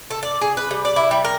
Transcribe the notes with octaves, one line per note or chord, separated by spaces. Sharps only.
A4
D5
G#4
B4
G3
D5
E4
G3
A#4